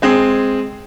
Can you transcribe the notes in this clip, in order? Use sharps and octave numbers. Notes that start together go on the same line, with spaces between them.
G#3 C4 G#4